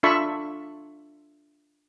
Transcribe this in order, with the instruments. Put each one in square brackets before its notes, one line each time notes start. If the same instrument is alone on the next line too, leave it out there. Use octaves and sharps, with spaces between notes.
[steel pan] D4 F4 A4 E5 B5 C#6